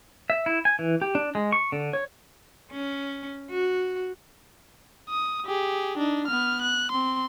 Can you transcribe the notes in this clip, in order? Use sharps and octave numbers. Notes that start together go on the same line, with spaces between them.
E5
E4
G#5
E3
G4
D4
G#3
C#6
D3
C#5
C#4
F#4
D#6
G4 G#4
D4 D#4
B3 F6
F#6
C4 C6